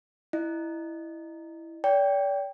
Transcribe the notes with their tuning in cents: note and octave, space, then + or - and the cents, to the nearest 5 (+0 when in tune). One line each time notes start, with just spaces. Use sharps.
E4 +0 D#5 -30
D5 -40 G5 +0